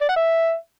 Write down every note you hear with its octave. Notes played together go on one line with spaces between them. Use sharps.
D5
F#5
E5